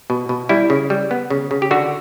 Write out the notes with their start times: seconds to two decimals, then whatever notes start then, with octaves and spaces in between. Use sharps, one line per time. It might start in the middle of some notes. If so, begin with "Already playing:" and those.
0.10 B2
0.29 B2
0.49 G3 E4
0.70 C#3
0.90 G3
1.11 B3
1.30 C#3
1.51 C#3
1.62 G4
1.71 D3 F#4